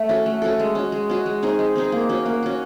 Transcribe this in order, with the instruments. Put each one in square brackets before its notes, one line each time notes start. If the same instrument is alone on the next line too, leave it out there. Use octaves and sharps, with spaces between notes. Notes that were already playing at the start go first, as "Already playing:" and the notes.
Already playing: [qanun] A3
C#4 F#4 A4
A3
C#4 F#4 A4
G#3
C#4 F#4
G#3
C#4 F#4
G#3
C4 D#4 G#4
G#3
C4 D#4 G#4
A#3
C#4 F#4
A#3
C#4 F#4